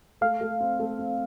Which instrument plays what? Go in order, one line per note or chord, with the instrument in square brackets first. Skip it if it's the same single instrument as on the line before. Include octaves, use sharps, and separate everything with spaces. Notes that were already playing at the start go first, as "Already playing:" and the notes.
[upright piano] A3 [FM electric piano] F5
[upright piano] A3
C4
A3
C4